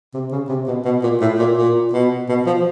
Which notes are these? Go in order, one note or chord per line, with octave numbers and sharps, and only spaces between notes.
C3
C#3
C3
B2
B2
A#2
A2
A#2
A#2
B2
B2
F3